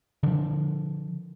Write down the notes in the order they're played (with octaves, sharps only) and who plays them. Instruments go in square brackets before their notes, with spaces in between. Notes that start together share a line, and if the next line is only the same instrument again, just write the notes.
[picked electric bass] D3 F3